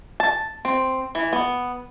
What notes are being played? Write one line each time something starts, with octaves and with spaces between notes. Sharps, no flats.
A5
C4
E3
B3